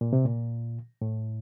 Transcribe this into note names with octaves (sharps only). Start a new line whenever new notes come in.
A#2
C3
A#2
A2